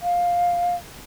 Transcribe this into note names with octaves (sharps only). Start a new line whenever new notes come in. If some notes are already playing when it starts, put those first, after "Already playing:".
F5